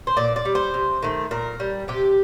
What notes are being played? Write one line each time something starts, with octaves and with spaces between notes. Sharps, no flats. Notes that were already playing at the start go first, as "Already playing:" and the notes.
C5
A#2 D5
D5
G3
C5
C3
D#3 A3
A#2 A#4
G3
C3 G4